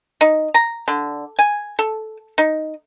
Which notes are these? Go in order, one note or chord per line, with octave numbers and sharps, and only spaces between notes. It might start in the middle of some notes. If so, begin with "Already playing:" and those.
D#4
A#5
D3
G#5
A4
D#4